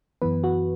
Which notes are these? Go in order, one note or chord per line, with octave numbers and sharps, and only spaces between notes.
F#2 E3 B3 B4
F#4